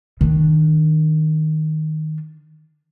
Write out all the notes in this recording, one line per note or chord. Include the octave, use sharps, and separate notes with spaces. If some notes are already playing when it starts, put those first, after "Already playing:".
D#3 D4